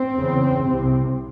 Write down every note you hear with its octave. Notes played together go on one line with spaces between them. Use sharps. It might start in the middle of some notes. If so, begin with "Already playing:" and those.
Already playing: C4
E2 C#3
C2 C3